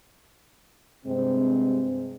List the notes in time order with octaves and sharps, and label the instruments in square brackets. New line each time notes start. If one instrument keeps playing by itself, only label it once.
[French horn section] G2 C3 G#3 C4